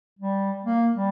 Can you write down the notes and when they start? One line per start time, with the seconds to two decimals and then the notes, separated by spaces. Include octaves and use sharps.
0.19 G3
0.64 A#3
0.94 G3